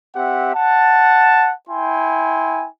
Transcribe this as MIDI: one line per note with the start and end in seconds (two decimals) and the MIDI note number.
0.16 0.51 60
0.16 0.51 67
0.16 0.51 76
0.16 0.51 78
0.55 1.52 78
0.55 1.52 81
1.69 2.66 64
1.69 2.66 79
1.69 2.66 80
1.69 2.66 84